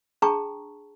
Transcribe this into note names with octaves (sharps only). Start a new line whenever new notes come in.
D4 G#4 G5 A5 A#5 C#6